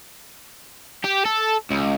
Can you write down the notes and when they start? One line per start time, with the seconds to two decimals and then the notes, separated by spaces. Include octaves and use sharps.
1.04 G4
1.25 A4
1.70 C#2